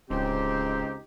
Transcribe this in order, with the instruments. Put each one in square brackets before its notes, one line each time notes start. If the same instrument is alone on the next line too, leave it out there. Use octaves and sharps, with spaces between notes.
[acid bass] D1 [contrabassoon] C#2 [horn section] C#3 C4 [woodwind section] D#4 G4